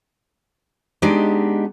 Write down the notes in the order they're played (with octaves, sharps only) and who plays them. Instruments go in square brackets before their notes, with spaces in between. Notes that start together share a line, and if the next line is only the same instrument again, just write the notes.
[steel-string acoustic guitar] G#3 B3 D4 D#4 G4